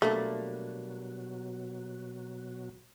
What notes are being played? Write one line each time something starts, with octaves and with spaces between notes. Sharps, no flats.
B2 F#3 G3 A3 A#3 D4